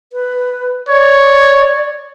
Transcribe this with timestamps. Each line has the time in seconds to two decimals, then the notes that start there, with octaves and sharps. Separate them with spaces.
0.13 B4
0.88 C#5 D5